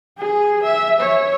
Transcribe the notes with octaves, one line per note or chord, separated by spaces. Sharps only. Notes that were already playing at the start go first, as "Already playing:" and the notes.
G#4
E5
C#5